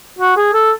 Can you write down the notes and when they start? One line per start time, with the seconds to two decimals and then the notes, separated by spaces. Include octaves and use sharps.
0.19 F#4
0.37 G#4
0.54 A4